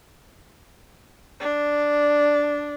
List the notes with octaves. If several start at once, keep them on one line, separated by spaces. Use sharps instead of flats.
D4